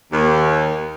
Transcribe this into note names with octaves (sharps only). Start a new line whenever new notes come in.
D#2